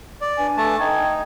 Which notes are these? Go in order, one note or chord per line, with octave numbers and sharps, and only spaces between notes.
D5
D4 B4 G#5
A3 A5
D#4 G5 G#6